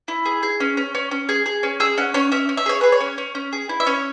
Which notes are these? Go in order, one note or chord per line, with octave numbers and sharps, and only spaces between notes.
E4
G#4
G#4
C#4
C#4
C#4
C#4
G#4
G#4
C#4
G#4 E6
C#4 F#5
C#4 C#5
C#4 E5
C#4
E5
G#4 C#5
G#4 B4
C#5
C#4
C#4
C#4
G#4
E4
E5
C#4 C#5